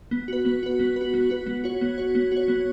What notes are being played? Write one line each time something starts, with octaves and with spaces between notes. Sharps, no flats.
B3
F#4 B4
B3
F#4 B4
B3
F#4 B4
B3
F#4 B4
B3
F#4 C#5
B3
F#4 C#5
B3
F#4 C#5
B3